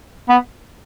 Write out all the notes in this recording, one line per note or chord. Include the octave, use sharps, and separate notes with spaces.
B3